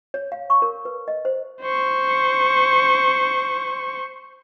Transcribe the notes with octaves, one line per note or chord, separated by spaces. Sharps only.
C#5
F5
C#6
A#4
B4
D#5
C5
C5 C#6